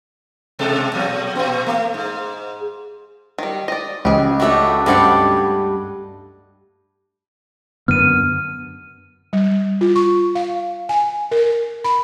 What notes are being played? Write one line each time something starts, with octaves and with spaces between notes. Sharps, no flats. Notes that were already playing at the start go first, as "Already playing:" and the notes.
B2 G#3 A4
A#2 F#3
A#2 B3
A3
G#2
D#3 G3
D5 D#5
C#2 G4 G#4
A3 D4 F#4 G4 E5
G2 G3 C4 D5 F#5 B5
F#2 D3 B3 F6 D#7
G3
F4
C#6
F5
G#5
A#4
B5